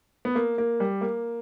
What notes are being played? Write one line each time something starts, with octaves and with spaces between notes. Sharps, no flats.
B3
A#3
A#3
G3
A#3